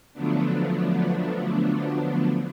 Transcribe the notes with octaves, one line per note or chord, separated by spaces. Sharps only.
D3 F3 F#3 A3 B3 D4